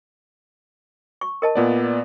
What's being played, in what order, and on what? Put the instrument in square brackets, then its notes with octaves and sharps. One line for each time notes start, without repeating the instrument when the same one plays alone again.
[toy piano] C#6
A#4 D#5 A5
[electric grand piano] A#2 B3 D5